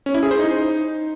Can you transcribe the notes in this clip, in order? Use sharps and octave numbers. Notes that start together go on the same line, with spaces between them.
C#4
E4
G#4
C5
D#4